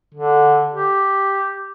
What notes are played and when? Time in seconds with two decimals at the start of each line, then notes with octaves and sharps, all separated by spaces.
0.14 D3
0.73 G4